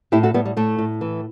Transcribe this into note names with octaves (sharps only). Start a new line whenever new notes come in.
A2 E4 G4
F#4 A4
A2 G3 B3
G3
A2 A3
A2
E3